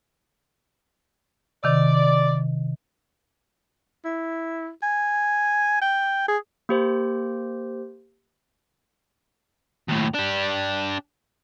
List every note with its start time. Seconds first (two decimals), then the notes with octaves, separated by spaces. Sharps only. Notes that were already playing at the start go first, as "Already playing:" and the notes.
1.64 C3 D#3 D5
4.05 E4
4.83 G#5
5.82 G5
6.28 G#4
6.69 A#3 G4 C5
9.89 D#2 A2
10.14 D4 G4